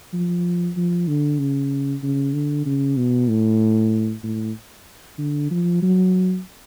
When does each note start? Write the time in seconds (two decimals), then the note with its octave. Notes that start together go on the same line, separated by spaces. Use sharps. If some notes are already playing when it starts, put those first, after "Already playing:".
0.13 F3
0.77 F3
1.08 D3
1.39 C#3
2.03 C#3
2.34 D3
2.66 C#3
2.97 B2
3.29 A2
4.23 A2
5.19 D3
5.51 F3
5.82 F#3